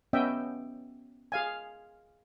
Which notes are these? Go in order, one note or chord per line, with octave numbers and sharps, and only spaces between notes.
B3 C#4 D#5 E5 G5
G#4 F5 G#5